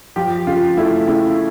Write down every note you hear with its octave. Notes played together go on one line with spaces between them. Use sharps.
F3 G4
C#3 F4
A3 E4
C#3 E4